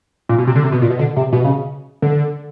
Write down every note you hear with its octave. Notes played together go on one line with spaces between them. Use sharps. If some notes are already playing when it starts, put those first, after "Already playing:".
A#2
B2
C3
D3
C3
B2
A#2
B2
D3
C3
B2
C#3
D3